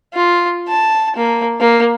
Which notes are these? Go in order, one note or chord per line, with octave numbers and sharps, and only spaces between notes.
F4
A5
A#3
A#3